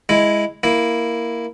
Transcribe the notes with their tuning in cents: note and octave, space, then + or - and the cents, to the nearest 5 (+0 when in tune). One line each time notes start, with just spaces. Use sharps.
G#3 +0 E4 +0
A#3 +0 E4 +0